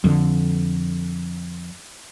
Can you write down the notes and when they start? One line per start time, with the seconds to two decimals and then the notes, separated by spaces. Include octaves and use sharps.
0.04 F2 D3